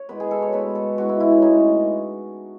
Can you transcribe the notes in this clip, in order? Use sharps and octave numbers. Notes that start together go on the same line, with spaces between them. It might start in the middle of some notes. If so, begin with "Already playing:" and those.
Already playing: C#5
B2 G#3 B3 B4
G#4
A4
C#5
B2 G#3 B3 B4
A4
B2 G#3 B3 F#4
E4
E4
C#4
A2 G#3 B3 D#4